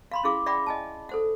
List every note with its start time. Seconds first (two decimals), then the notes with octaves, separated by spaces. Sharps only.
0.12 F5 B5 C6
0.24 C#4 E4 G#4 F5 D6
0.46 D5 E5 F#5 G5 B5 D6
0.66 D#5 G#5 A5
1.09 A4 C5 F#5